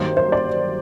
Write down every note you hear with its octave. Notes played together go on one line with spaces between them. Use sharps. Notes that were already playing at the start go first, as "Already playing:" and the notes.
Already playing: G2 D#3 F#3 A#3 C5
C5
D5